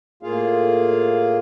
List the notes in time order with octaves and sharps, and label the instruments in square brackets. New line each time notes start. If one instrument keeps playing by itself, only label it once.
[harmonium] A2 A#3 F4 G#4 F5